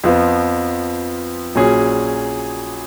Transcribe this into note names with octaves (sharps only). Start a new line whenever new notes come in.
F2 F3 B3 F4
A#1 A#2 F#3 C#4 G#4